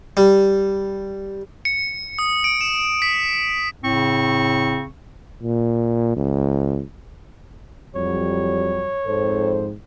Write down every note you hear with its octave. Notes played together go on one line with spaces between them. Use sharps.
G3
C#7
D#6
D7
E7
B6
A2 C#3 C4 C#6
A#2
C#2
F2 F#3 G3 C#5
F2 G#2 A4 C5